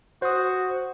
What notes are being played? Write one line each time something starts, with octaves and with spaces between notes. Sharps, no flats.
F#4 C5 D#6